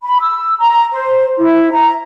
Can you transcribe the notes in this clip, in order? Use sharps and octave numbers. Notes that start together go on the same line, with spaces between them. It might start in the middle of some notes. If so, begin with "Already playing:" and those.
B5
E6
A#5
C5
E4
A#5